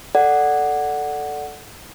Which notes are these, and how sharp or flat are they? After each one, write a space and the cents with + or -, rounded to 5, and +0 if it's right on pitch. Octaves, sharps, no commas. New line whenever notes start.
A4 +0 D5 +0 F#5 +0